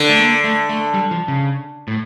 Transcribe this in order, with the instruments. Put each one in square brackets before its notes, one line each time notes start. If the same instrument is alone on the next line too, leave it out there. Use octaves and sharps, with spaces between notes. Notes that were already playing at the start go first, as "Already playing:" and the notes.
Already playing: [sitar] D3
[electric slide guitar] A3
A#3
A3
A3
G3
F3
C#3
A2